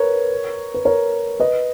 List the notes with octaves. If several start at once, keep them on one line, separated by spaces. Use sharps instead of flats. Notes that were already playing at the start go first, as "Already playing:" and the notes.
Already playing: A#4 B4 C#5
B4
A#4 C#5
B4 D#5